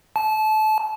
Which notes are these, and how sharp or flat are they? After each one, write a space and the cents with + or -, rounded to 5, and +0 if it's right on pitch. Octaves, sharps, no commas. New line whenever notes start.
A5 -25